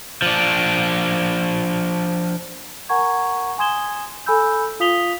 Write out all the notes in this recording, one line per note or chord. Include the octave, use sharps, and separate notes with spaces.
F3 D4
A#4 F#5 G#5 A#5 C#6 G#6
G#5 C6 D#6 G#6 E7 G7
A4 G#5 B5 E6 G6
F4 F5 D#6 B6 F7 G7